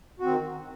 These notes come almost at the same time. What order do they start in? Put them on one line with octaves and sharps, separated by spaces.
F#4 C4 D#3